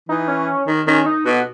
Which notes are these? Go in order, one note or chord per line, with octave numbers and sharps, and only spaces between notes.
E3 D#4
C#4
D#3
D#3 C#4
D#4
B2 F#4